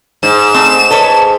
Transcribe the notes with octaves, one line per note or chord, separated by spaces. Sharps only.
G#2 E7
A3 C4
A4 B4 C#5